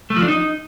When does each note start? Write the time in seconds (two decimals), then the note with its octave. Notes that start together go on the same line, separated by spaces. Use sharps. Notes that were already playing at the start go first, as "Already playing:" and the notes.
0.10 A3
0.16 F3
0.22 D4
0.28 D#4